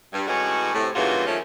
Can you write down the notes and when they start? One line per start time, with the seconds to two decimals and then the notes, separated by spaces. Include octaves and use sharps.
0.14 G2
0.27 A2 E3 G#3 C#4 F#4
0.74 A2 C3
0.95 G2 A#2 C#3 E3 F4 F#4
1.27 D#3 F3 A3 C#4